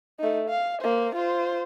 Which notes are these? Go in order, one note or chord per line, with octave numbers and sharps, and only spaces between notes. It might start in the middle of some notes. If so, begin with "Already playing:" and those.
A3 D#4
F5
A#3 C5
F4 C5